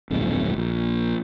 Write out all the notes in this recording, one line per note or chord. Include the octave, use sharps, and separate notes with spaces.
D1 A#1 F2 G#2
A#1